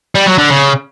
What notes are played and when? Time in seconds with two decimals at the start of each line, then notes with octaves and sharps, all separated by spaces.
0.15 G3
0.27 F#3
0.38 D3
0.50 C#3